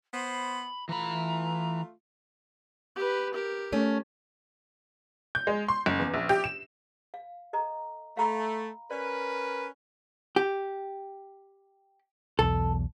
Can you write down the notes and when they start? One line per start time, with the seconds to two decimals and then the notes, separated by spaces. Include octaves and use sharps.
0.13 B3 C5 B5
0.89 E3 A3 F4 A#5 B5
2.96 G4 B4
3.34 G4 A#4
3.72 A3 C#4
5.35 G6
5.47 G#3
5.68 C6
5.86 F#1
5.99 E2
6.14 A#1
6.29 G4
6.44 E7
7.14 F5
7.53 A4 D#5 A#5
8.17 A3 F5 A#5 B5
8.91 C#4 A#4 B4 D5
10.36 G4
12.39 B1 E2 A4